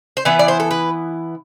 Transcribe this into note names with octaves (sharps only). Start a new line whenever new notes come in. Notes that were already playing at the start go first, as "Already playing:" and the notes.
C5
E3 B3 E4 B4
D5
C5
A4
B4